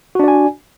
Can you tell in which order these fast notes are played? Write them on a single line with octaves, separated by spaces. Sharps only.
F#4 D4 D5 G#5